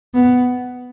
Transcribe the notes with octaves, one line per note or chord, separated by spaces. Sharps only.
B3